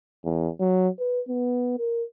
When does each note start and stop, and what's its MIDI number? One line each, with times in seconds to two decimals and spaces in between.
0.24 0.49 40
0.60 0.88 54
0.99 1.20 71
1.28 1.74 59
1.78 2.03 70